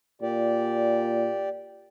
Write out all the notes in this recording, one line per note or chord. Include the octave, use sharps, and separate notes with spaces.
A#2 G4 D5